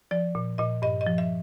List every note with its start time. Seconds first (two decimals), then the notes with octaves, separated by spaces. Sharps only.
0.11 F3 D5
0.35 A#2
0.58 A#2 D#5
0.82 G2 D#5
1.01 D#5
1.06 F3
1.18 E5